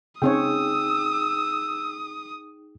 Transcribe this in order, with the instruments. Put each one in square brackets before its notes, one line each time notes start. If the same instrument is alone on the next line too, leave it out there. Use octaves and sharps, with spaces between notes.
[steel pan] C#3 C4 C#5 [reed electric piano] D#4 G#4 G5 [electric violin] D#6 [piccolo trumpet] E6